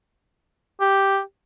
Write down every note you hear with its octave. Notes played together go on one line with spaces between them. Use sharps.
G4